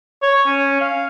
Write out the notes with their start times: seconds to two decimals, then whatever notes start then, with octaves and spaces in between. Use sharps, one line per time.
0.22 C#5
0.46 C#4
0.81 F5